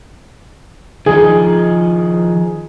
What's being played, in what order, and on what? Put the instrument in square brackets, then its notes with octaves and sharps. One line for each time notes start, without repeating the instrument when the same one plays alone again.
[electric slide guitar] D#3 F3 D#4 [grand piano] G#4